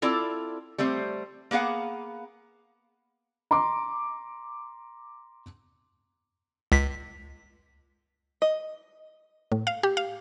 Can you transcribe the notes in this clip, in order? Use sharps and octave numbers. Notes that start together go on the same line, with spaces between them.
C4 E4 F4 A4 D5
G3 A3 C4 C5
A#3 B3 G#4 F5 F#5
A#5 C6 D6
C#2 B6
D#5
A2
F5
G4
F5